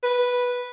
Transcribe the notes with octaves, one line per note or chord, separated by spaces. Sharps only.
B4